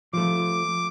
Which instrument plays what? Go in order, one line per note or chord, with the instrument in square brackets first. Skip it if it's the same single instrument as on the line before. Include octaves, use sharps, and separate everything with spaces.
[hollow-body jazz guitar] F3 A3 [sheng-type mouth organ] D6